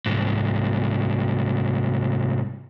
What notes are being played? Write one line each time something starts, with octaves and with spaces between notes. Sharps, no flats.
C2 G#2